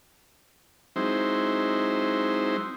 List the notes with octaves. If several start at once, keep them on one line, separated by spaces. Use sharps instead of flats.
F#3 G#3 C4 D#4 E4 C5